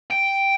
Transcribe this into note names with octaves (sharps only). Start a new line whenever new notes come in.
G5